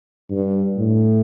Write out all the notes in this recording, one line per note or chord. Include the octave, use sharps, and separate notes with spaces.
G2
A2